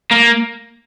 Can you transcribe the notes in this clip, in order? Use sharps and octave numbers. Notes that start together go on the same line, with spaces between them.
A#3